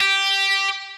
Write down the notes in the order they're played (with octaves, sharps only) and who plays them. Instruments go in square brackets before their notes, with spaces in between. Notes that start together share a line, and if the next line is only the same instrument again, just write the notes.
[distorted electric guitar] G4